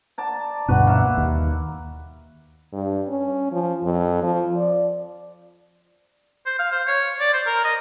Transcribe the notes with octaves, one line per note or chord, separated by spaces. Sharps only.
D5 A5 A#5
D2 G2 B2 F#4 B4
A#3 E5 F#5
D#2
G2
C#4
F3
F2
F3
D5
C5
F5
C5
C#5
D5
C5
A#4
D#5